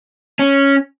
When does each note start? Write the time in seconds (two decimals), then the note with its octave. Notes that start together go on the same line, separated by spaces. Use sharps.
0.39 C#4